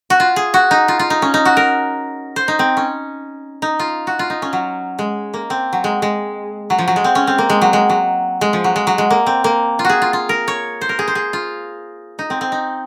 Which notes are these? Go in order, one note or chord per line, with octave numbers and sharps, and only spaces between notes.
F#4
F4
G#4
F#4
D#4
F4
F4
D#4
C#4
D#4
F#4
A#4
C5
D#4
C4
C#4
D#4
F4
F#4
F4
D#4
C#4
F#3
G#3
A#3
C4
F#3
G#3
G#3
F#3
F3
F#3
G#3
C4
C#4
C4
A#3
G#3
F#3
G#3
F#3
G#3
F3
F#3
G#3
F#3
G#3
A#3
C4
A#3
F4
F#4 G#4
F4
F4
A#4
C#5
C5
A#4
G#4
C5
G#4
F4
D#4
C4
C4
D#4